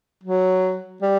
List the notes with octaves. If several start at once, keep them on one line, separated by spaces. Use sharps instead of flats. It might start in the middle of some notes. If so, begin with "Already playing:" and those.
F#3
G3